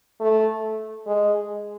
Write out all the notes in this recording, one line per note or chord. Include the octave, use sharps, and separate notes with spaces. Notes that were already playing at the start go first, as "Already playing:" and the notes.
A3
G#3